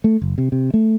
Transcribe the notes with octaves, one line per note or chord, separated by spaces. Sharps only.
A3
F#1
C3
C3
A3